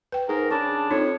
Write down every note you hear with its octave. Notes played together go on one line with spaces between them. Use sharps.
B4 G5
G#2 A#4
C#3 D4 A5 C#6
F2 D#4 C#5